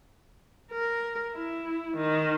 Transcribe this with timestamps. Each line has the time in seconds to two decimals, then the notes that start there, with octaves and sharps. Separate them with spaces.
0.71 A#4
1.33 E4
1.97 D#3